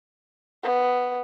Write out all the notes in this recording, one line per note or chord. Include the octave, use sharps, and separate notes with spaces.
B3